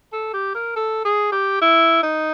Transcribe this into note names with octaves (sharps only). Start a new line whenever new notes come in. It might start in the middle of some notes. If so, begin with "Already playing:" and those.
A4
G4
A#4
A4
G#4
G4
E4
D#4